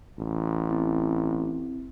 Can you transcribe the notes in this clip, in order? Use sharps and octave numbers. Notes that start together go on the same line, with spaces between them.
A1
C4 E4